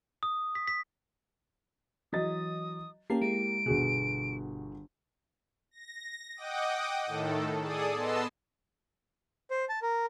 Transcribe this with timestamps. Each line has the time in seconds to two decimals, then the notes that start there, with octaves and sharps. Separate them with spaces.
0.23 D#6
0.55 B6
0.68 B6
2.13 E3 F#3 D#5 D#6 A6
3.10 A#3 C#4 G4 A5 C7
3.22 G#3 E4 A#5 D7
3.66 G1 B2 F#4 G#4
5.71 A#6
6.36 D#5 F#5 G5 D6 D#6
7.06 A2 D#3 A4
7.61 G#4 A4 D5 D#6
7.94 B3 D#5 A5 C6 E6
9.51 C5
9.69 A5
9.82 A#4